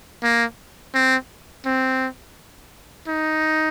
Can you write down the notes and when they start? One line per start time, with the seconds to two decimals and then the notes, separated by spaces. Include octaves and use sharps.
0.23 A#3
0.94 C4
1.65 C4
3.08 D#4